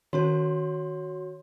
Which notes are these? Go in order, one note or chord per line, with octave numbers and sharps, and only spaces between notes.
D#3 C#4 F#4 A#4 C#5 C6